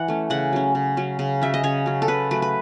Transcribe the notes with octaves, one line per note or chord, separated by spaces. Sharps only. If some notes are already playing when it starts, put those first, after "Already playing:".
Already playing: E3 F#5
A3 C#4
C#3 F#5
F#3 C#4
C#3
F#3 C#4
C#3
F#3 C#4 E5
D#5
C#3 C#5
F#3 C#4
A4
C#3 B4
F#3 A3 B4
B4